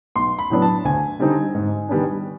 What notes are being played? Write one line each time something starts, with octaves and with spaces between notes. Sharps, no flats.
B1 C6
B5
A2 F#3 B3 D4
A5
D2 G#5
D3 G3 C4 D#4
G#2
D#3 G3 B3 D4